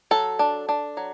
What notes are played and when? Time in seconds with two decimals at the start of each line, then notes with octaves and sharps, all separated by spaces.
0.11 F#3 A4
0.39 D4
0.69 D4
0.97 F#3